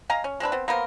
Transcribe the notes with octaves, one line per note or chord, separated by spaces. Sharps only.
D#5 F5 G#5 A#5
C#4
G#3 C4 D4 B4
B3 C4
A#3 B3 A#4 C5